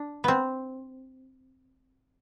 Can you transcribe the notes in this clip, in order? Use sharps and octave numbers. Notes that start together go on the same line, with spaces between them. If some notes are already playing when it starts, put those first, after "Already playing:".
Already playing: D4
B3 C4